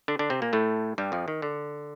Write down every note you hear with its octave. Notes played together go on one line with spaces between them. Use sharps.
D3 D4
D3 D4
C3 C4
A#2 A#3
A2 A3
G2 G3
F2 F3
D#3
D3